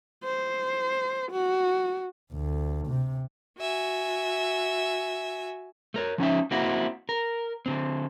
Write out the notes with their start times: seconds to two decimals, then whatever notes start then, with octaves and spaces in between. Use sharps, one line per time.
0.24 C5
1.31 F#4
2.33 D2
2.88 C3
3.59 F#4 E5 G#5
5.94 A3 A#4 C#5
6.18 F3 C#4 D#4 E5
6.51 A#3 C4 E4 F#4
7.09 A#4
7.66 D3 C4